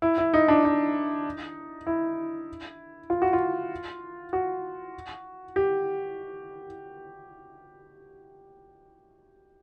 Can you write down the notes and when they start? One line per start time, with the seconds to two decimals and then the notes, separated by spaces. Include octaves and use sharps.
0.02 E4
0.18 E4
0.34 D#4
0.48 D4
0.65 D#4
1.87 E4
3.10 F4
3.22 F#4
3.33 F4
4.33 F#4
5.56 G4